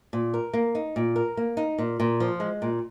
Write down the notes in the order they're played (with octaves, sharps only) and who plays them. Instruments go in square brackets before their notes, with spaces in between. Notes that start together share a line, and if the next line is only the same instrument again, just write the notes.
[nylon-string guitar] A#2
A#4
A#3
D#4
A#2
A#4
A#3
D#4
A#2
A#2
F3
G#3
A#2